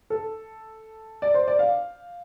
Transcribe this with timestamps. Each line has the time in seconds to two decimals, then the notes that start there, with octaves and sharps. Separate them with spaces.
0.10 A4
1.22 D5
1.34 C5
1.48 D5
1.59 F5